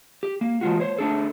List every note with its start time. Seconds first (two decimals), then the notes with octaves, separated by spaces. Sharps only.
0.23 G4
0.41 A#3
0.61 E3 G#3 F4 F#4
0.80 C5 C#5
0.98 A3 D4 G#4 A4